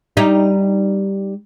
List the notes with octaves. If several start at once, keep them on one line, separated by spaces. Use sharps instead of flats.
G3 D#4